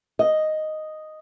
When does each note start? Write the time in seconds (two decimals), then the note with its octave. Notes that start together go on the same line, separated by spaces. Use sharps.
0.19 D#5